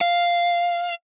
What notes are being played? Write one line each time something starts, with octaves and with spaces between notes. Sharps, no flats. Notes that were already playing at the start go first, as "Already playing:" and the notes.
F5